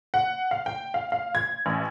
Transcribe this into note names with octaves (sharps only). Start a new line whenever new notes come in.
F#5
F5
G5
F5
F5
G#6
A1